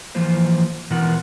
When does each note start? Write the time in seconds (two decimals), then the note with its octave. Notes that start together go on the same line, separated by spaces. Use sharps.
0.15 E3 F3 A#3 F4 C5
0.90 B2 E3 B3 F4 A#4 F#5